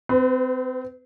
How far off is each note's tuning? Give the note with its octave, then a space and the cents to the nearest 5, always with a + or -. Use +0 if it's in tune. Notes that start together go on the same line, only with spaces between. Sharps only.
C4 -30 B4 +30